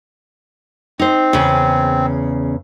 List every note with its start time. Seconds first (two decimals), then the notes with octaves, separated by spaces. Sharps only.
0.99 C4 D#4 C5
1.33 E2 C#3